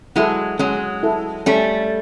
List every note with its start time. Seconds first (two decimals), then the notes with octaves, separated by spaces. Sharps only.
0.16 F#3 G#3 E4 A4
0.59 F#3 G#3 C#4
1.03 E4 A4
1.46 G3 A3 C#4